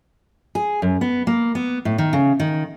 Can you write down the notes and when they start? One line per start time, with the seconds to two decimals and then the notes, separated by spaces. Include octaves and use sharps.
0.55 G#4
0.82 F#2
1.01 B3
1.27 A#3
1.55 B3
1.85 A2
1.98 D#3
2.13 C#3
2.40 D#3